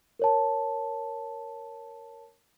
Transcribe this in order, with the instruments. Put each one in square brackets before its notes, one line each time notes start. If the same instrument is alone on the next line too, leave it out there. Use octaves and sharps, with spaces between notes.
[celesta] A#4 C#5 A5